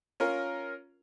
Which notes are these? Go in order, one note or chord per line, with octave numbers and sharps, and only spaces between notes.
C#4 F4 A#4